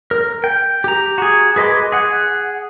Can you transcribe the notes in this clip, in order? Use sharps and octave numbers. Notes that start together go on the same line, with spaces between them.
A#4
G5
G4 A#5
F#4 G#4
G#4 B4 D#5 C6 D6
G#4 F#5